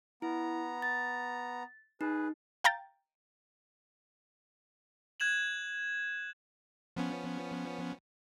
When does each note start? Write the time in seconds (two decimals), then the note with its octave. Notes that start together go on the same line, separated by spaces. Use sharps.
0.22 B3 E4 A#5
0.82 A6
2.01 D#4 G#4 B4
2.64 F5 G5 A#5 G6 A6
5.20 F#6 G#6 E7 F#7
6.96 F3 B3 C#4